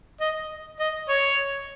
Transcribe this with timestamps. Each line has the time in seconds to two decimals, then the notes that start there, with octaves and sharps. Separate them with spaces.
0.21 D#5
0.80 D#5
1.09 C#5